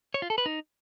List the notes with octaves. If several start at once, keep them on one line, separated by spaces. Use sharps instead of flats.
C#5
F4
A4
B4
D#4